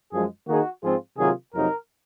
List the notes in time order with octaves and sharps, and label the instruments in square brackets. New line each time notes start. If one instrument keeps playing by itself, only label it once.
[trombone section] F#2 F3 G#3 [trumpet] G#4
[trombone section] D#3 A#3 D#4 G#4 [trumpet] F#4
[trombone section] G#2 F3 C4 F4 G#4
[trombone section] C3 D#3 F#3 A#3 F4 [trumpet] G#4
[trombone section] F2 C3 F#3 A#3 D#4 [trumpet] A#4